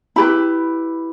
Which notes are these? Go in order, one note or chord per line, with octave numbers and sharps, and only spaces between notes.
E4 G4 B4 B5